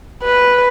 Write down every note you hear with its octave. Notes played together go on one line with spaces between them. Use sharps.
B4